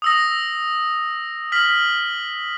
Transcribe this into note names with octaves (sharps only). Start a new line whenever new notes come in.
D#6 E6 A#6
F6 B6 F#7